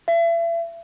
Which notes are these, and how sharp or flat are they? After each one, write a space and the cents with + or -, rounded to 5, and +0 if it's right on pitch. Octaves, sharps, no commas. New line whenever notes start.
E5 +35